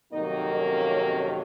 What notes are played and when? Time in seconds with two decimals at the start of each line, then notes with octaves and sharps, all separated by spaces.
0.12 F2 C3 D#3 F#3 A#3 D#4 D#5
0.56 C#4 C#5
0.98 C#4 C#5